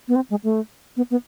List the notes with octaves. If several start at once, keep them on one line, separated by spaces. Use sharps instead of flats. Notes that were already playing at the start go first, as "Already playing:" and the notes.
B3
C4
G#3
A3
B3
B3